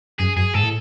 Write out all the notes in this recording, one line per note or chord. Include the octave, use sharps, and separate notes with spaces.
F#2 G#4
F#2 G#4
G#2 A4
A2